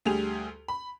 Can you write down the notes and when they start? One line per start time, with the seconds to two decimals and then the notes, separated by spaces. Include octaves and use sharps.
0.05 D2 G3 G4 G#4 F7
0.68 B5